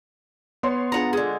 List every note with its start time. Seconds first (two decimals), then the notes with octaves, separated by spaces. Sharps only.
0.63 B3 C#5 C6
0.92 D4 F4 G#4 F#5 A#5
1.13 D3 G#3